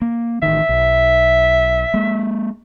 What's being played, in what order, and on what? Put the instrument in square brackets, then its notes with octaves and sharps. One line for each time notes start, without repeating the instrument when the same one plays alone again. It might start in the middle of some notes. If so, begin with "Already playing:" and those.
[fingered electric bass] A#3
[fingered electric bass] A1 D#3 [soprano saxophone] E5
[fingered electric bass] B1
G#3 A#3